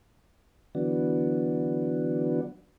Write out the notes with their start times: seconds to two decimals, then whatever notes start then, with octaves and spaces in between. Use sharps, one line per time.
0.75 D3 E3 F#3 B3 D4 F#4